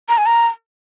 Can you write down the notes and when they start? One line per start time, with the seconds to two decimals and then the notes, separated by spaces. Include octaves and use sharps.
0.09 A#5
0.18 G#5
0.26 A#5